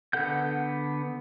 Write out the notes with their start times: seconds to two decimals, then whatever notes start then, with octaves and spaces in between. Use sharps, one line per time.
0.13 D3 B3 A4 F#5 G6